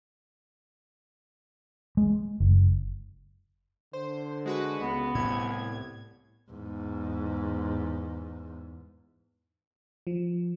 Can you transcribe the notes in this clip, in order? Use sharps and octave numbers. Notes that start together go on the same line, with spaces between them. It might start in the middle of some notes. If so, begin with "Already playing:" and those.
G#3
F#1
D3 C5
G#3 F#4 B4
C#2 B3
C2 A2 G#6
E2 G#2
F3